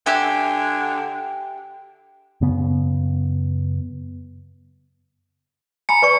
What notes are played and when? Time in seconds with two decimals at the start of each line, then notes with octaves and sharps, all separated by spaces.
0.06 D3 G4 E5 G#5
2.41 F#2 C#3 B3
5.89 G#5 A#5 B5 C#7
6.02 B4 D5 C#6